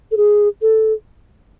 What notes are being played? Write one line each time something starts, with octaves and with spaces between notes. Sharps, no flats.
A4
G#4
A4